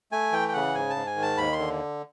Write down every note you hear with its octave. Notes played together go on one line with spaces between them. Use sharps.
A3 G#5
E3 G5
G5
C#3 F#5
G#2 G#5
A5
G#2
G#5
D#3
A5
D#2 B5
C6
D3